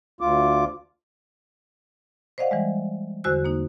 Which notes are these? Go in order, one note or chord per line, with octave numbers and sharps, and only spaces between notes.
D2 F4 D6
C5 D5 D#5 F5 F#5
E3 G3 G#3
E2 D3 F#4 C5 E6 F#6
A#3 D#4